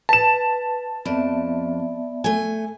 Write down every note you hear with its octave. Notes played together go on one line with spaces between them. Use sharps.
B4 A5 E7
F2 B3 D5 E5
A3 G#5